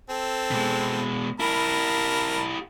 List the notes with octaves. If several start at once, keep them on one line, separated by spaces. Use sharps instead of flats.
C4 A4
B2 G#3
E4 G4 A#4 A5 B5